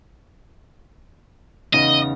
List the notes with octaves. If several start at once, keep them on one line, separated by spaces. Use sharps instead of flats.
E2 C#3 D#4 D#5